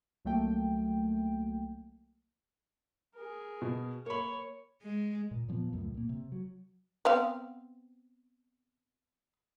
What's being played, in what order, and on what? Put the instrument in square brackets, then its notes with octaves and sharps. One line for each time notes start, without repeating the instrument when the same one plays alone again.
[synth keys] C2 F#3 A3 A#3 G5
[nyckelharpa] G#4 A#4
[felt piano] B2
[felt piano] A#3 B5 [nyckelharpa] C#5
[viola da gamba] G#3
[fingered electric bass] A#2
A#2 F3 G#3 B3
C#2 F#2 A2
A#2 A#3
C3
F#3
[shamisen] B3 C4 F5